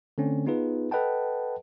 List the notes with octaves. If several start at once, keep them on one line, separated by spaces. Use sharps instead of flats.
D3 A3 C4 C#4
B3 D#4 F4 G#4 B4
A4 B4 D#5 F#5 G5 A5